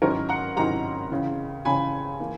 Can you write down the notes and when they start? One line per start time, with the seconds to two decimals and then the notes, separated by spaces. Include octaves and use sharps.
0.02 G#2 D#3 F#3 C#4 E4 A#4 C#5
0.29 F#5 A#5
0.56 G#2 D#3 F#3 C#4 E4 F#5 A#5
1.11 C#2 C#3 E3
1.65 C#2 C#3 E3 G#5 B5
2.20 E3 A#3 E4